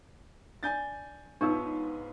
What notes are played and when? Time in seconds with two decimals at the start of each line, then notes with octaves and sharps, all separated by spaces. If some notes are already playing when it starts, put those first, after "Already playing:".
0.63 D4 G#5 G6 A6
1.41 G#2 B3 D4 D#4 F4 C#5 C#6 E6